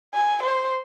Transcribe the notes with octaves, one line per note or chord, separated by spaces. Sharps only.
G#5
C5